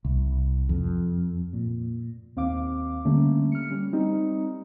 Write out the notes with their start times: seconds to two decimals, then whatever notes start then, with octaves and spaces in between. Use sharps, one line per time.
0.05 C2
0.69 F2
1.53 A#2
2.36 D#2 C4 F5 D6
3.05 D3 G3 A3 A#3 C#4
3.52 F6 C#7
3.70 G3 C#4
3.93 G3 C4 D#4